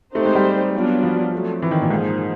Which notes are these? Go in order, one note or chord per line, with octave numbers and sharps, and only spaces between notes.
A3 C4 D#4 G4 C5
G#3
G3
F#3 B3 D4 F4
F3
F#3 A3 C4
E3
D#3
A#2
G#2 F3 A#3 D#4 G#4